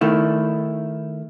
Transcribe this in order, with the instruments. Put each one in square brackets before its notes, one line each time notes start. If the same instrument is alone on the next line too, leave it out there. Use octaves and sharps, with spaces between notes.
[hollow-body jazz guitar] D#3 A3 E4